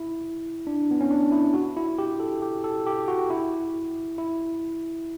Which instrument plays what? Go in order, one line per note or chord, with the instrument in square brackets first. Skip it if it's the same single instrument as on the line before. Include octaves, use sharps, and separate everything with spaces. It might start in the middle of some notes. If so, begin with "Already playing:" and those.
Already playing: [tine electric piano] E4
D4
B3
C#4
D4
E4
F#4
E4
G4
A4
G4
A4
G4
F#4
E4
E4